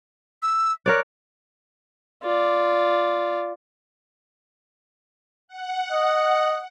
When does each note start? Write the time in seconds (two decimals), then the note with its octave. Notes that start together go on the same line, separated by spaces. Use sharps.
0.42 E6
0.86 A#4 C#5 D5 F#6
2.23 F4 D5
5.48 F#5
5.92 D#5